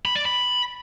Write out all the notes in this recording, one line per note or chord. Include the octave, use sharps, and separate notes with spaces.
B5
D5
B5